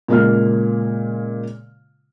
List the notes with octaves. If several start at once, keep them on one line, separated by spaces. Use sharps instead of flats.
A#2 C#3 G#3 A#3 F4 F6